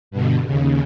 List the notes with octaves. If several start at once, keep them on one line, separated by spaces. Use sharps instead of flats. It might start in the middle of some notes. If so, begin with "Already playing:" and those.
G2 B2 D3
D#2 C#3